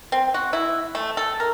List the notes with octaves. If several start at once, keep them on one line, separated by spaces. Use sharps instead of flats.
C4
F#4
E4
A3
A4
A#4